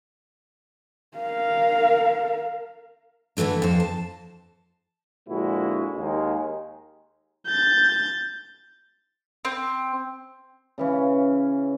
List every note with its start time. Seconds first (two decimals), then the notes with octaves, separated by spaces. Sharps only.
1.17 A#4 F5
3.37 D3 E3 F3 A3 D4
3.62 F2 C5
3.80 A5
5.29 A#2 D3 F3 G#3 E4 F#4
5.96 D#2 G#3
7.47 G6 A6
9.45 C4
10.78 C#3 E3 C#4